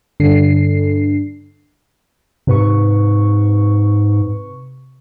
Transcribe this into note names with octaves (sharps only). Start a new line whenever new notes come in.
G2 D3 D4 A4 C7
G#2 C3 B4 C#6